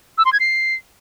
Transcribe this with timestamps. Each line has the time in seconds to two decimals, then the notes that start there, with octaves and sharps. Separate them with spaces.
0.18 E6
0.25 C6
0.33 G#6
0.40 C7